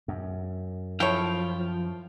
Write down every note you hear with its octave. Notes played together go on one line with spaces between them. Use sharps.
F#2
F3 E4 A4 C#5 F5 G5